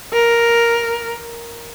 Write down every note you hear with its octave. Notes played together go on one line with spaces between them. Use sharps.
A#4